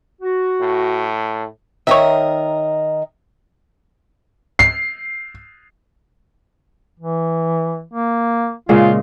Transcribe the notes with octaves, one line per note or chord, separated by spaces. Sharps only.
F#4
A2
D#3 A#4 C#5 D#5 E5
C7
E3
A#3
A#2 C#3 G#3 F4